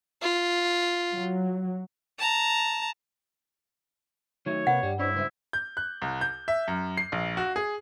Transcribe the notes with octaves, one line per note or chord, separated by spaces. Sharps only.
F4
F#3
A5 A#5
D#3 F#3 A3 C#5
C3 A#3 B4 F#5
G2 G3
D4 E4 C5 C#5
C#2 C5 E5
G6
F#6
C2
G6
E5
F#2
C7
A#1
F#4
G#4